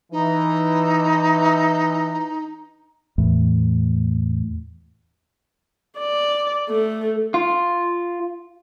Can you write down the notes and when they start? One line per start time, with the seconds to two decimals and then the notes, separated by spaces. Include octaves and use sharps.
0.12 E3 D#4
3.18 E2 A2
5.99 D5
6.70 A3
7.34 F4